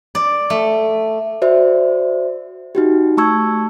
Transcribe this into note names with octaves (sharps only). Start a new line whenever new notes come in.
D5
A3
F#4 C5 D5 E5
D#4 F#4 G4
A3 A5 C#6 E6 G#6